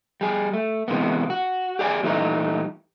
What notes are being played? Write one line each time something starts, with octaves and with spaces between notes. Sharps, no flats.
G3 G#4
A3
C3 E3 G#3 A#3 B3
F#4
G4 G#4 D5 F5 G#5
A#2 E3 G3 A3 D4 D#4